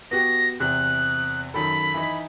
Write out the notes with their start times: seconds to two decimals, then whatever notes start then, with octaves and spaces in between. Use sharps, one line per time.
0.11 B3 F#4 G4 A#6
0.60 E2 C3 F#6
1.54 F#2 D#3 A4 B5
1.94 E3 D#4